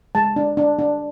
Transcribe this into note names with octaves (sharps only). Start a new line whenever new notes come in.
G#3 A5
D4
D4
D4